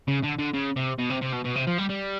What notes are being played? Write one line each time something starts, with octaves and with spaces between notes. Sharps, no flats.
C#3
D3
D3
C#3
C3
B2
C3
C3
B2
B2
C3
F3
G3
G3